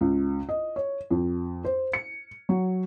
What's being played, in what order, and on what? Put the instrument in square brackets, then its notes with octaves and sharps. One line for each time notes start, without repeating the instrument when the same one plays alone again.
[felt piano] C#2
D#5
C#5
F2
C5
C#7
F#3